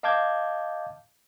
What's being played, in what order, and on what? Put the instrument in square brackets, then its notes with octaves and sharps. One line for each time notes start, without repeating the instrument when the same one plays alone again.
[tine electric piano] D#5 F5 A5 D6 G6 G#6